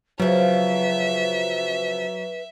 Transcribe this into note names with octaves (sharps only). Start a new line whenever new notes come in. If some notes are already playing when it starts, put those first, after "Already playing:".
C#3 F3 F#3 B4 E5